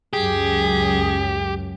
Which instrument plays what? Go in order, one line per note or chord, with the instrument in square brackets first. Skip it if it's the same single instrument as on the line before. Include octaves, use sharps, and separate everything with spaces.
[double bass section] C#2 F#2 [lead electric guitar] G4 [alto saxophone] G#4